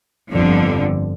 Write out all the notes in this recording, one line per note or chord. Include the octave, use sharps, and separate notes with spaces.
G1 F2 D3 F3